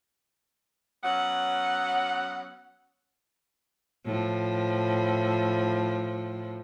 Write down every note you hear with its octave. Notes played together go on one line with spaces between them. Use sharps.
F#3 B3 C#4 F#5
A2 F3